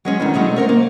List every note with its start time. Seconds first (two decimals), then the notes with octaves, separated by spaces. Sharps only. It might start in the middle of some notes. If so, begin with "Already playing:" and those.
0.05 F#3 G#3 C#4
0.20 E2 D3 D#3
0.34 F#3 G#3 A3 C#4
0.56 C4 A#4 C#5
0.69 A#3